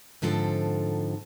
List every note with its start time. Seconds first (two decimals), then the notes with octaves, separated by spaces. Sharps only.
0.22 G#2 D3 F3 C4 A4